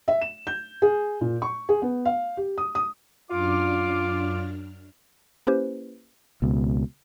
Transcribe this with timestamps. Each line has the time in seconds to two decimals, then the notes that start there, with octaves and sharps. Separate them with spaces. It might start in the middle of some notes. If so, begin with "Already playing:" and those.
0.08 E5
0.21 E7
0.47 G6
0.82 G#4
1.21 A#2
1.42 C#6
1.69 G#4
1.82 B3
2.05 F5
2.37 G4
2.58 D#6
2.75 D#6
3.31 F#2 D4 F4 D6 F6
5.47 A#3 C#4 E4 G4 B4 C5
6.42 C#2 B2